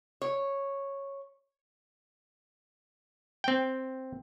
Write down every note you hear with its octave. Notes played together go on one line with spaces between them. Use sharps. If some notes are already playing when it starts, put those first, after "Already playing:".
C#5
C4 G5